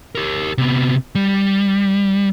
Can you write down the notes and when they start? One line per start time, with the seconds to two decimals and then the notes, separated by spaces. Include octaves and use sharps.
0.15 G4 A#4
0.58 C3 B3
1.15 G3